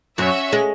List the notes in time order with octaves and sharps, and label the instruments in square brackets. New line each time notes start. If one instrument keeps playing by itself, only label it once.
[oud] F#2 F#3 [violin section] C#4 F#4 C#5 E5
[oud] G#3